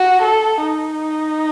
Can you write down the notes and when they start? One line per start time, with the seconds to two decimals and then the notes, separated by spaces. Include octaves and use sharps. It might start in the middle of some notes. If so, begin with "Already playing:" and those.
Already playing: F#4
0.22 A4
0.62 D#4